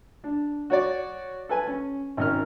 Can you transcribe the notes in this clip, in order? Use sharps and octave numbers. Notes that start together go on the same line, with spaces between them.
D4
F#4 C#5 D5
A4 B4 G#5
C#4
G#1 C#4 A#4 F6